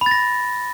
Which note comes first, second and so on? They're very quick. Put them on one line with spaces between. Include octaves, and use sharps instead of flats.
B5 A6 A#6